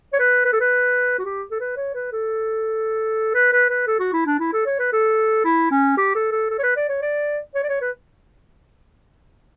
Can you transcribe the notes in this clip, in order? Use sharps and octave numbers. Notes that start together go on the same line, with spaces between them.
C#5
B4
B4
A4
B4
F#4
G4
A4
B4
C#5
B4
A4
B4
B4
B4
A4
F#4
E4
D4
E4
A4
C#5
B4
A4
E4
C#4
G4
A4
A4
A4
C#5
B4
D5
C#5
D5
C#5
D5
C#5
B4